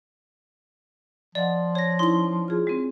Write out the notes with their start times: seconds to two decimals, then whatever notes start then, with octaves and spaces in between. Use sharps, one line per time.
1.35 F3 D5 D#5 F5 F#5
1.75 C#5 A#6
1.99 C#4 D#4 E4 C6 G7
2.48 F4 G#4
2.67 G#3 C4